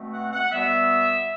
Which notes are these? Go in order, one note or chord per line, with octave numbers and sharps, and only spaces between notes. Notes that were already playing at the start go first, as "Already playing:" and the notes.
Already playing: B2 A3 C4
F#5
F#5
B2 G3 B3 E5